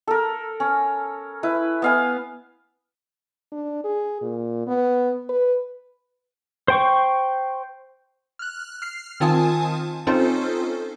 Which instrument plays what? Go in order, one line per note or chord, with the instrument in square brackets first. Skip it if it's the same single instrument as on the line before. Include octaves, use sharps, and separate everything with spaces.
[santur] A4 A#4
C#4
E4 B4
B3 F5 G#5
[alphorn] D4
G#4
A#2
B3
B4
[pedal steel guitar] C5 G5 C#6
[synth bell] F6 F#6
F6 C7
D#3 C4 F4 G#5 A5 D#6
C4 C#4 D#4 F4 A4 C5